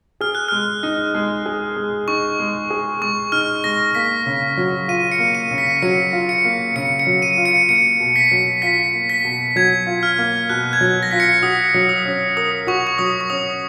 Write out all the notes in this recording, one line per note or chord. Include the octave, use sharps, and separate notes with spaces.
G#4 F6
F#6
G#3 F6
D#4
G#3
G#4
G#3
D#4 C#6
G#3
G#4
G#3 C#6
D#4 F6
G#3 A#6
A#3 B6
C#3
F#3
F4 D#7
C#7
A#3
D#7
C#3
B6
F#3 C#7
F4
C#7
A#3
C#3 C#7
C#7
F#3
D#7
F4
C#7
A#3 C#7
B2
B6
F#3
F4 B6
A#3
B6
B2
F#3 G#6
F4
F6
A#3
B2 F#6
G#6
F#3
A#6
F4 B6
C#7
F#4 D#6
F#3
D#6
C#4
A#4 D#6
F#4 C#6
C#6
F#3 D#6
C#6
C#4 D#6